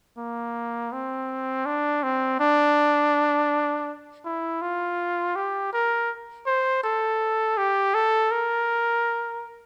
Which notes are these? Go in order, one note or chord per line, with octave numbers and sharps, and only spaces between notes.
A#3
C4
D4
C4
D4
E4
F4
G4
A#4
C5
A4
G4
A4
A#4